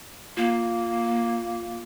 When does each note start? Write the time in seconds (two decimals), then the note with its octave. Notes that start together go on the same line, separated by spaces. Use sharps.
0.37 A#3 F4